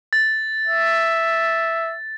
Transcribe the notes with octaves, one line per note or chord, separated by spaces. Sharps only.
A6
E5